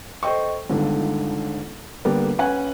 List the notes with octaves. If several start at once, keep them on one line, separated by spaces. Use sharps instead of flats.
A4 C5 D#5 G5 C#6
G1 C#2 D3 D#3
D3 G3 A#3 B3 D4
C#4 B4 F#5 G#5